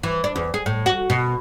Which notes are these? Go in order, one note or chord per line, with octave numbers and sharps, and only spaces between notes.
E3
D4
E2
G#4
A2
F#4
B2